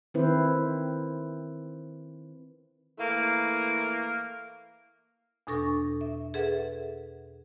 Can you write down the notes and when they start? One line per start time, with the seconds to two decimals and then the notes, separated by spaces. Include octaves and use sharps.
0.14 D#3 C4 E4 B4 C5
2.98 E3 A3 A#3
5.47 E2 B2 D4 A4 C#6 A#6
6.01 E5
6.34 G#4 A4 B4 E5 F#5